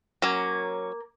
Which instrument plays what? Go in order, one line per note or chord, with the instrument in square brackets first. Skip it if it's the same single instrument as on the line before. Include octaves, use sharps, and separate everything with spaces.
[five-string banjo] F#3 C#4 [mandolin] A#3